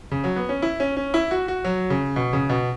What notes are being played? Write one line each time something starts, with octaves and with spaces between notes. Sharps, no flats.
C#3
F#3
B3
C#4
E4
C#4
C#4
E4
F#4
F#4
F#3
C#3
B2
C#3
B2